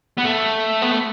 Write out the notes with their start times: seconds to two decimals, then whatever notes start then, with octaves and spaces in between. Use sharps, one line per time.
0.17 B3
0.24 A3
0.82 B3
0.92 A3